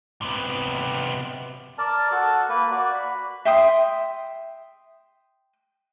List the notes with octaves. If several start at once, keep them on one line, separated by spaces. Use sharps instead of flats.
C3 B3
A#4 D5 A5
F#4 A4 A5
A#3 B4
F#4 D5
B5
E5 G5 C6 D#6